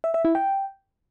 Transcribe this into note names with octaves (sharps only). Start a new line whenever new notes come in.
E5
E5
E4
G5